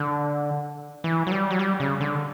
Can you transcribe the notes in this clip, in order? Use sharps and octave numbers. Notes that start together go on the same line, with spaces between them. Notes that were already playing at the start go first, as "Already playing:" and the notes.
Already playing: D3
E3
F#3
G3
F#3
G3
C#3
D3